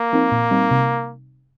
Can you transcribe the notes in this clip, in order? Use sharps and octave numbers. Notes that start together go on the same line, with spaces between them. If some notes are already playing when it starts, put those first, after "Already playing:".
Already playing: A#3
F3 C4 D#4 A#4
A#2
G3 C4 D#4
C3